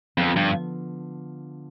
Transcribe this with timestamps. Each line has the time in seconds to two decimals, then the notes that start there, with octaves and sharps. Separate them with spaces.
0.17 F2 D3 F3 B3 D4 A4
0.36 G2